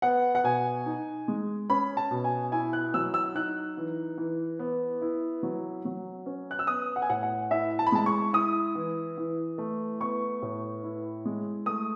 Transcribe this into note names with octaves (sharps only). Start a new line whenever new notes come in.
B3 F#5
F#5
B2 G#5
D#4
G#3
C#4 B5
A5
B2
G#5
E4 G#5
F#6
F#3 E6
E6
D#4 F#6
E3
E3
B3
E4
F#3
F#3
C#4
F#6
E6
B3 D#6
F#5
G#5
A2 F#5
F#5
E4 E5
A5
B5
G#3 A5
C#6
E4 D#6
E3
E3
A3
B3 C#6
A2
E4
G#3
A3 D#6